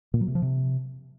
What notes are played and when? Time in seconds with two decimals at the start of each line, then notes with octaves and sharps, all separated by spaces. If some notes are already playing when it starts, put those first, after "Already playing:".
0.14 A#2
0.21 F#3
0.28 C3
0.35 F3
0.42 C3